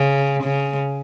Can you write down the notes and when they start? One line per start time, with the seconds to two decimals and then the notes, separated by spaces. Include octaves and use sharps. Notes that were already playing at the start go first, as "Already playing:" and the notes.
Already playing: C#3
0.44 C#3